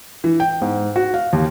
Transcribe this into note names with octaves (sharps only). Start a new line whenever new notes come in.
E3
G5
G#2
F#4
F5
D#2